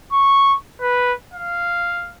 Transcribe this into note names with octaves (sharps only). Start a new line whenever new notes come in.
C#6
B4
F5